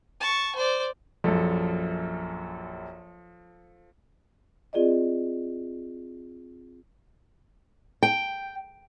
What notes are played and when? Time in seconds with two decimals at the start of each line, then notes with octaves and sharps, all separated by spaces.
0.20 A5 C#6
0.55 C5 D5
1.24 A#1 F#2 F3 A4
4.73 C4 F4 G#4 D5 D#5
8.03 G5